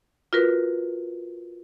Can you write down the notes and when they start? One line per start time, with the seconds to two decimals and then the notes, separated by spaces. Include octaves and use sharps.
0.33 F4 F#4 A#4 B4